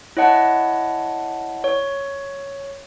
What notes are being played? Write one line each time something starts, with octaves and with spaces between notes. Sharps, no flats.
E4 C#5 D#5 F#5 A5
C#5